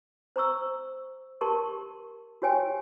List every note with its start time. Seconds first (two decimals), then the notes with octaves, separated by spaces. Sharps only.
0.36 C5 A#5 C#6 E6
1.41 G4 A#4 A5 C6 C#6
2.42 F#4 G4 C#5 G5 G#5